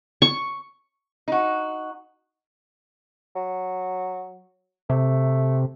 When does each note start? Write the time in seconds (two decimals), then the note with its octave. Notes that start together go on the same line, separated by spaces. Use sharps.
0.22 C#6
1.28 D#4 F#4
3.36 F#3
4.90 C3 A3